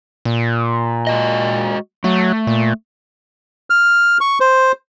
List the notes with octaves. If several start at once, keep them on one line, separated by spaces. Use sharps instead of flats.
A#2
G#3 F#4 D#5
F#3 A3
A#2
F6
C#6
C5